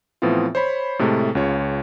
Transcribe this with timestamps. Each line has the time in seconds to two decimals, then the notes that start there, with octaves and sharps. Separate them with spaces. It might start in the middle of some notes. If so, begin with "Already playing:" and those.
0.22 A2 E3 F3 B3 C4 F4
0.55 C5 C#5 B5
0.99 A2 C3 G#3 A3 A4
1.35 C#2 C#3 F4 C#5